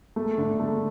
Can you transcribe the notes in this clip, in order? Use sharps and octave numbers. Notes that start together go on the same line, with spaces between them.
A3
D3
A3